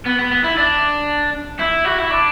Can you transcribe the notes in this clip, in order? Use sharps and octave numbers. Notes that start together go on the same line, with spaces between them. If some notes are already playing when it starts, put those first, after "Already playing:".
B3
B3
B3
E4
D4
E4
F#4
E4
D4